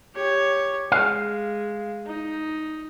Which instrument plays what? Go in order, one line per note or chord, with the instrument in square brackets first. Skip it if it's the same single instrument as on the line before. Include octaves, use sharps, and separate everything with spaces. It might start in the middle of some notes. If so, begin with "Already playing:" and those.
[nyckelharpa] G4 C#5
[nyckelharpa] G#3 [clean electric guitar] F5
[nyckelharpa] D#4